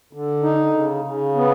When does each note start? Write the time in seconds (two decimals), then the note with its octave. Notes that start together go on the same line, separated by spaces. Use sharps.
0.13 D3
0.43 D#4
0.74 C#3
1.04 C#3
1.35 B3